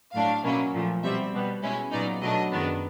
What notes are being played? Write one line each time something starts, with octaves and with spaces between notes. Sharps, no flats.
A2 F#3 A3 D4 F5
B2 F#3 A#3 C#4 E4
A#2 F3 A3
B2 G3 C4 E5
B2 G3 B3
B2 G#3 C#4 E4
A#2 F#3 B3 D#4 D5
B2 F#3 A3 D4 D#5
F#2 D#3 G#3 B3 D4